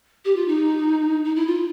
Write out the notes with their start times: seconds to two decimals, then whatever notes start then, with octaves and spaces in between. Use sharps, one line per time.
0.25 G4
0.36 F4
0.47 D#4
1.25 D#4
1.36 E4
1.47 F4